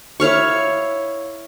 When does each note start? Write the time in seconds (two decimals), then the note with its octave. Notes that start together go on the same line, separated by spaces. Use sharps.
0.20 E4 C#5 F5 C#6